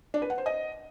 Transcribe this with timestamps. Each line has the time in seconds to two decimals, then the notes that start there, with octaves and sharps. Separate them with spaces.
0.14 D4
0.22 B4
0.30 F#5
0.38 C5
0.46 D#5